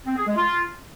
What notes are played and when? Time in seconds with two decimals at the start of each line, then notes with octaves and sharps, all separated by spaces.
0.06 C4
0.16 G#4
0.27 G#3
0.37 F4